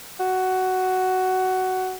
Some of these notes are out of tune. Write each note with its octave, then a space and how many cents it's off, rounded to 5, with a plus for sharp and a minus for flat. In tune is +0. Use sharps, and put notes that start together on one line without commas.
F#4 +10